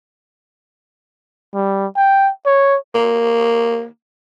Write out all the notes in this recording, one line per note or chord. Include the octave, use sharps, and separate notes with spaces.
G3
G5
C#5
A#3